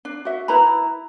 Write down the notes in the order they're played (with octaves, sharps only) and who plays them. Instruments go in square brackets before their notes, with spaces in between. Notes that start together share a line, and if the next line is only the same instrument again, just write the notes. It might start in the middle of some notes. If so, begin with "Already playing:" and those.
[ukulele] D4
F#4 E5
E4 B4 A#5 B5